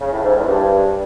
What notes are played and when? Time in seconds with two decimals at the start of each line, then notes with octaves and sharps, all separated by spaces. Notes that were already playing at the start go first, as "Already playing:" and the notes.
0.01 C#3
0.12 A2
0.24 G#2
0.36 E2
0.47 G2